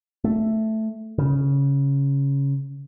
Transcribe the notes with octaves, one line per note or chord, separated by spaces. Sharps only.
A3
C#3